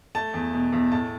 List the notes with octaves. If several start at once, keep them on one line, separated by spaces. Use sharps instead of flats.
A3 A5
E2
B2
E2
A2 A5